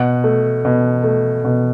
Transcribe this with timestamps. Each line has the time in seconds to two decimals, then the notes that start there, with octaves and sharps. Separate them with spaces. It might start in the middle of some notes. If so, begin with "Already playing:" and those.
Already playing: B2 F#5
0.24 A3
0.65 B2
1.04 A3
1.44 B2